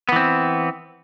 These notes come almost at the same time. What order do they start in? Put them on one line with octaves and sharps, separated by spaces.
B3 E3 C4